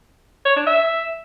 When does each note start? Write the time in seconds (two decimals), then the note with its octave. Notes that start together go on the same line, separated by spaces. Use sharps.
0.45 C#5
0.56 D4
0.67 E5